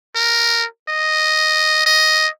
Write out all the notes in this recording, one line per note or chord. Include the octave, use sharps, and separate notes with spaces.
A#4
D#5
D#5